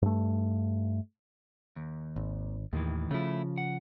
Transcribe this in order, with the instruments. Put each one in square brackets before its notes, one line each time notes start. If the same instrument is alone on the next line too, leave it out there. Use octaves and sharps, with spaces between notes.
[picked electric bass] G2 A3
[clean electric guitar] D#2
[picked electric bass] G#1
[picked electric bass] D#2 [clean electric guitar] A2 D#3 E3
[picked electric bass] C#3 F3 [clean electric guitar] A3 E4
[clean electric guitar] F#5